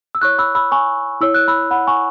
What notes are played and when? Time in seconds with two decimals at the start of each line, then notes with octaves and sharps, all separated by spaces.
0.15 E6
0.21 E4 C#5 C#6 F#6
0.38 B5 E6
0.55 B5 E6
0.72 G#5 C#6
1.21 E4 C#5 E6
1.34 F#6
1.48 B5 E6
1.71 F#5 B5
1.87 G#5 C#6